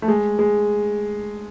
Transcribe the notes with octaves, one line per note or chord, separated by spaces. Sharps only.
A3
G#3
G#3